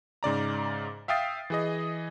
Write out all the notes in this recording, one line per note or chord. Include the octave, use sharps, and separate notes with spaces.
G#2 C#3 D5 A#5
E5 F5 G5 D#6 A6 C7
E3 G#4 D#5